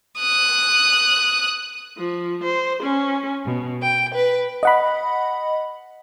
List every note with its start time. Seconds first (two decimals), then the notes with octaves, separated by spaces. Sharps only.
0.20 D#6 F#6
1.97 F3
2.43 C5
2.83 C#4
3.45 B2
3.81 G5
4.14 B4
4.63 D#5 F#5 B5